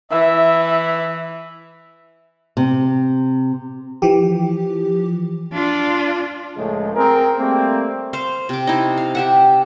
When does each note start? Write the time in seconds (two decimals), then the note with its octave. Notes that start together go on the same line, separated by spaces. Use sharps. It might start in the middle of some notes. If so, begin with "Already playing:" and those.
0.12 E3 E5
2.57 C3
4.02 E3 F3 G4
5.53 D4 F4
6.57 C#2 A2 C#3 F3 G#3 A3
6.95 C4 G#4 A#4
7.39 G3 A3 A#3 C4
8.13 C5 F5
8.49 C3 D6
8.67 D#4 E4
8.97 F5
9.15 G4 E5 F#5